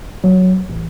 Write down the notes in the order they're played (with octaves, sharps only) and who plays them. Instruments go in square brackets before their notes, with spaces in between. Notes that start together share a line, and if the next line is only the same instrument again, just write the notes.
[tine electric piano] F#3
A1